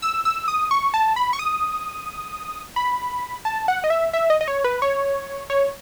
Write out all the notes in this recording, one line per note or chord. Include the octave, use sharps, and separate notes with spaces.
E6
E6
D#6
C#6
A5
B5
C#6
D#6
B5
A5
F#5
D#5
E5
E5
D#5
D#5
C#5
B4
C#5
C#5